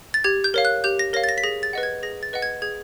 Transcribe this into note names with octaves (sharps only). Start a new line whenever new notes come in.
A6
G4 G#6
G6
A#4 C#5 F5
F#6
G4 G6
A#6
A#4 C#5 F5 A#6
A6
A#6
B6
G#4 A#6
A6
B4 D#5 F#5
G#6
G#4 A#6
A6
B4 D#5 F#5
G#6
G#4 G#6